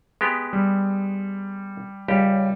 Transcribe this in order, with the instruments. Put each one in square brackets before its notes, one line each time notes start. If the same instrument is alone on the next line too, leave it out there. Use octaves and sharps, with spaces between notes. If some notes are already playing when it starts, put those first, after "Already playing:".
[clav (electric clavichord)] G#3 B3 G4
[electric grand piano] G3
[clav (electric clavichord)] C#2 G4 [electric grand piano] G3